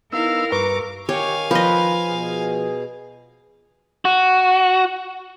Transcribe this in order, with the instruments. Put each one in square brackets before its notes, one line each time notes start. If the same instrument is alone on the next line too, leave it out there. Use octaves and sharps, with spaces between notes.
[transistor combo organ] B3 D#4 E6 [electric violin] E4 F5 [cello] A#4
[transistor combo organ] G2 A#5 C#6 [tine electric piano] B4 [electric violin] D6
[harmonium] D#3 [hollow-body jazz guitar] G4 [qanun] C#5 [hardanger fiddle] F5 G#5
[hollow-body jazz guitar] F3 [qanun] B4 D#5
[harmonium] B2 G#4
[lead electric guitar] F#4